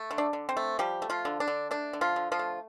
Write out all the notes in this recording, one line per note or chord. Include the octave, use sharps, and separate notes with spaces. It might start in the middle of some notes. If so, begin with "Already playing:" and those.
Already playing: A3
D3
D4 D5
D3
C4 C5
A3
F3 G3 G4
A3
F3 F4
D3
D4
D3
A3 D4
D3
F3 F4
D3
F3 F4
A3